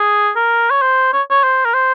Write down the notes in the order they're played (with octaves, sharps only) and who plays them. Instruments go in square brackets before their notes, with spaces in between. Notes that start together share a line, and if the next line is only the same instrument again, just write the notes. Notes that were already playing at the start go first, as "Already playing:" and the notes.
Already playing: [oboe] G#4
A#4
C#5
C5
C#5
C#5
C5
A#4
C5